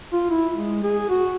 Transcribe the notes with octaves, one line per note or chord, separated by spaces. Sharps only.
F4
E4
G#3
G#4
F#4